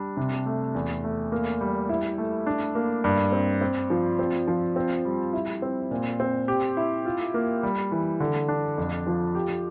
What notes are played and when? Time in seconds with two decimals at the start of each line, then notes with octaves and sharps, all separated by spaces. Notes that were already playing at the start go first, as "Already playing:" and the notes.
Already playing: G3 D4
0.17 C3
0.46 A3
0.74 E2
1.04 A3
1.32 A#3
1.61 G3
1.89 E4
2.18 A3
2.46 D4
2.75 A#3
3.04 G2
3.32 C4
3.61 C4
3.90 F3
4.19 C4
4.48 F3
4.76 C4
5.05 G3
5.33 E4
5.62 C4
5.91 A#2
6.20 C4
6.48 G4
6.77 E4
7.05 F4
7.34 A#3
7.63 G3
7.92 E3
8.20 D3
8.48 D4
8.78 F2
9.07 F3
9.35 G4